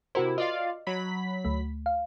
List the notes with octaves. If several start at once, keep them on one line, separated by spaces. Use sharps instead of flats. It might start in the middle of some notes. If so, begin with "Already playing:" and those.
C3 E4 F#4 A#4 C5
F4 D5 D#5 F5
F#3 B5 B6
D2 A3
F5